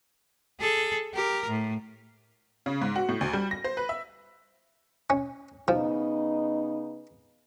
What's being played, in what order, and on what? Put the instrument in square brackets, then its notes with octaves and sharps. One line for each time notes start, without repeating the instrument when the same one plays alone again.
[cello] G#4 A4
G4 A#4
A2
[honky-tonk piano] C#3
G#2
F#4
A2
D2
G3
A#6
C5
B4
E5
[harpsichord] C#4
[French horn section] C#3 B3 D#4 [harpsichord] F3